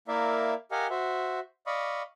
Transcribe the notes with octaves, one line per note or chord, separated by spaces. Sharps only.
A#3 E4 A#4 D5 E5 F5
G4 A#4 D#5 F5 F#5 G#5
F#4 C5 E5
D5 D#5 F5 B5 C#6 D#6